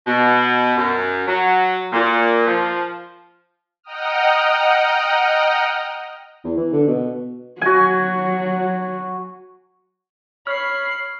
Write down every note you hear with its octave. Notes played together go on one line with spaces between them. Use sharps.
B2
F#2
F#3
A#2
F3
D#5 F#5 G5 A#5 D#6 F6
E2
E3
D3
B2
F#3 F#4 G#5
C#5 B5 F6 C7